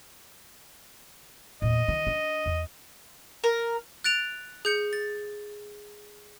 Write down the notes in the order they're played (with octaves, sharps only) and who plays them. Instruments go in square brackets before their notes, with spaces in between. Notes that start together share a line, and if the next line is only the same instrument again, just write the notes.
[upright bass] E2 A#2 [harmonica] D#5
[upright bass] D#3
D4
E2
[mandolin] A#4
[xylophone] F#6 A6 D7 F7
G#4 G6 C#7
A6